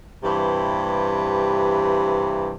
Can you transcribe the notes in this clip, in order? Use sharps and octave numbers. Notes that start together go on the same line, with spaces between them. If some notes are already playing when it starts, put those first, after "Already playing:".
G2 C3 E3